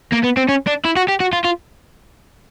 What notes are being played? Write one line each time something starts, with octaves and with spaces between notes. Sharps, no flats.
A#3
B3
C4
C#4
D4
E4
F#4
G4
F#4
F4
F4